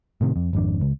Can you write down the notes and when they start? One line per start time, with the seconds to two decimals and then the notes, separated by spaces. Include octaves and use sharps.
0.21 A2 C3 D#3
0.36 F2
0.53 G#1 F2 D4
0.81 C#2